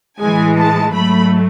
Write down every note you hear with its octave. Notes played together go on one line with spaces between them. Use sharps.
A2 E3 G#3 G#5
A5
G#2 F#3 A3 B5